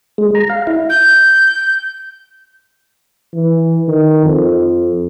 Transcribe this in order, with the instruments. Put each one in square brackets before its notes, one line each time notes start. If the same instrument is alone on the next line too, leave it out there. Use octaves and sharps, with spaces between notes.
[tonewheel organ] G#3
A#5
F5
E4
[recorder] G6
[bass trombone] E3
D#3
F2